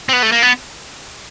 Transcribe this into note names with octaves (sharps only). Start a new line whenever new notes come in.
C4
B3
A3
A#3
B3